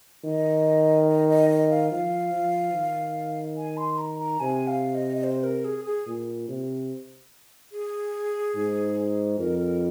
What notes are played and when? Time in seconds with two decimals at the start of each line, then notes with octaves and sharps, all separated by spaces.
0.24 D#3 D#5
1.08 D#5
1.29 D#5
1.50 D#5
1.70 F5
1.91 F3 F5
2.33 F3
2.74 D#3
3.57 G#5
3.77 C6
3.98 A#5
4.19 A#5
4.40 C3 G#5
4.67 F5
4.95 D#5
5.17 D#5
5.24 C5
5.44 A#4
5.65 G#4
5.85 G#4
6.07 A#2
6.48 C3
7.72 G#4
8.56 G#2
9.38 F2 A#4
9.59 A#4